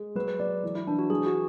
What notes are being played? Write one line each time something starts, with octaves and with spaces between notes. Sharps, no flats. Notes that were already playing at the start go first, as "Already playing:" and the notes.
Already playing: G#3
F#3 B4
B4
F#3 D5
E3
E4
E3 D4
F#4
F#3 G#4
F#4